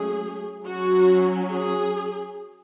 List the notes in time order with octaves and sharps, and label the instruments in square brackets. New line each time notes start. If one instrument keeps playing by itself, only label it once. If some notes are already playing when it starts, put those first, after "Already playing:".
Already playing: [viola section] F#3 A3 C#4 G#4
F#3 C#4 F#4
G#4